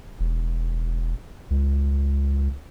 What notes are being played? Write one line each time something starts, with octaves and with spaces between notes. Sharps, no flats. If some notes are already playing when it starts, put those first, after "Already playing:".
E1
C#2